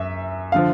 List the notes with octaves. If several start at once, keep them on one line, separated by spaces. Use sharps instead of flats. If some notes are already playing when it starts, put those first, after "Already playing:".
Already playing: F#2 E5
D3 F3 F5